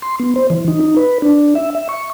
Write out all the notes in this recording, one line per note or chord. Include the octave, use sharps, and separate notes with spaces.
C6
B3
C5
E3
D#4
D#4
B4
D4
E5
E5
C#6